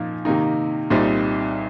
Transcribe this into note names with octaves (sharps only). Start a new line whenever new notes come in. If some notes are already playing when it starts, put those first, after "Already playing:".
Already playing: A#2 F3 A#3 D#4
C3 D#3 A#3 D#4
C2 A#2 G3 C4 D#4